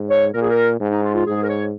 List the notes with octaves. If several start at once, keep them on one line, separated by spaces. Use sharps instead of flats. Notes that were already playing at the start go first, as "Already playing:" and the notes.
Already playing: G#2
C#5
A#2 A#4
G#4
A#4
G#2
D#4
F4
F4
G#2 G#4
A#4
C#5